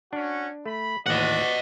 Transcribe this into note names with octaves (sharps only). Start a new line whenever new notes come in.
C#4 D4 F#4
A3 B5
A1 D#2 A2 F#4 D5 D#5 F#5